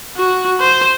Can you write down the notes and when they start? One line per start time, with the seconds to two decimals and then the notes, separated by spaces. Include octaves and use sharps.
0.16 F#4
0.61 C5